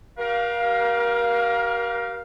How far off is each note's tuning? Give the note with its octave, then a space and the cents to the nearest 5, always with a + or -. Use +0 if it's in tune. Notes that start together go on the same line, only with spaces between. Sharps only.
G4 -40 A#4 +30 F5 +0